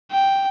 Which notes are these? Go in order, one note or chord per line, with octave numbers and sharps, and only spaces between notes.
G5